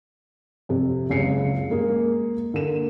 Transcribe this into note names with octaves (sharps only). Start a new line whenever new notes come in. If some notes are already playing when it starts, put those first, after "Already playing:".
F2 C3
F#1 C#2 C7 C#7
G#3 A#3 G#4
D3 A#3 E7